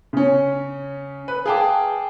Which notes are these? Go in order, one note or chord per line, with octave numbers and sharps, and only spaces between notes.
C#3 C#4
B4
G#4 F5 G5 A5 D6